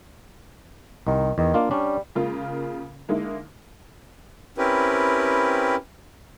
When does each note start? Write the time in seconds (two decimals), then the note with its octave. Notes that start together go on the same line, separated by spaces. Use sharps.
1.07 C2 D#3
1.38 E2 D#3
1.54 A#3 D4 F4
1.71 G3 C#4 D4
2.15 C#3 G#3 A#3 F4 A#4
3.08 D3 G#3 A#3 D#4 E4
4.58 C4 C#4 E4 G4 A#4 B4